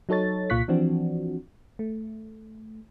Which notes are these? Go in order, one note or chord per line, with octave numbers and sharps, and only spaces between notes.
F#3 D#4 A4 C#5 A6
C2 A#2 F4 C#6 F#6 B6
E3 F3 C4 D4 F#4
A3